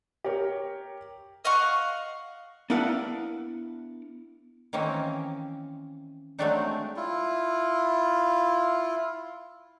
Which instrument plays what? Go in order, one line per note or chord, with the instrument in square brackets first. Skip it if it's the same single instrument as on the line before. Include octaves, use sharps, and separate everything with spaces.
[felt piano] G4 A#4 C#5
[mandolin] D#5 F5 F#5 C#6
[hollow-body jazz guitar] B3 D4 E4 A#4 F5 F#5
[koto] D#3 E3 A#3 C4 C#4 E4
F#3 G#3 A3 C4 D4 D#4
[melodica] E4 F4